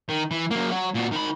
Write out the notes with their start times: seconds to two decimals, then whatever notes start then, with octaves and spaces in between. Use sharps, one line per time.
0.09 D#3
0.31 E3
0.51 F#3 A#3
0.71 F#3
0.94 A#2 F#4
1.11 D#3 B5